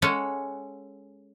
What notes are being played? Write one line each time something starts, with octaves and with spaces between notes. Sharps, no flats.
G#3 C#4 A4 F#5